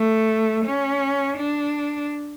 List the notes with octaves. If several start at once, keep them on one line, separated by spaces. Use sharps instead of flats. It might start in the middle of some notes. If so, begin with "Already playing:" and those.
Already playing: A3
C#4
D4